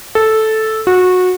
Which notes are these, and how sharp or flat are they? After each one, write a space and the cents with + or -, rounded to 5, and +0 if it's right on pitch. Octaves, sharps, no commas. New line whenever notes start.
A4 -5
F#4 -20